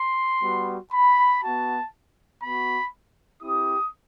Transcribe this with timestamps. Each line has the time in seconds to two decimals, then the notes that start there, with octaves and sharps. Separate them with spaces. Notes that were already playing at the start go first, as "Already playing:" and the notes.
Already playing: C6
0.43 G3 B3 F#4
0.93 B5
1.43 B3 F#4 A5
2.42 B3 F#4 B5
3.42 C4 E4 G4 D#6